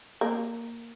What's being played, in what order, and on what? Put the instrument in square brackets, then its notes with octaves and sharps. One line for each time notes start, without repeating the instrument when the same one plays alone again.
[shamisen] A#3